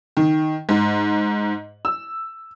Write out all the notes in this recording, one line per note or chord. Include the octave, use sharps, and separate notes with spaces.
D#3
G#2
E6